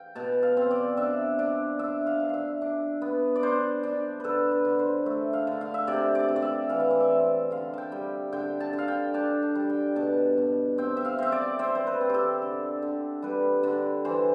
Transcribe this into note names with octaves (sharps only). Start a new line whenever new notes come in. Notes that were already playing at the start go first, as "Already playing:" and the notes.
Already playing: F5 G5
B2 A5
F5
C4
D5
D4 E5
D4
D4 E5
F5
D4
E5 F5
D4
B3
D5
D4 C5
D4
D3 A4 B4
B4
D3
C5
A3 E5
F5
D3
F5
E5
C3 D5
D5
C3
D5
E5
E3 F5
E5
D5
E5
C4
D3 F5
G5 A5
G3
D3 G5
A5
D3
F5
G5
D4 A5
A5
G3
G5
B2 A5
B2
C4 G5
E5
F5
C4 E5
D5
C4 C5
C5
B4
C4
G4 A4
D3
D3
G3 B4
D3
E3 C5